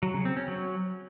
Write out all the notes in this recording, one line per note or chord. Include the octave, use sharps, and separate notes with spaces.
F#3
C#3
C4
C#4
F#3